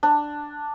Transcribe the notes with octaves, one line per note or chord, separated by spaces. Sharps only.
D4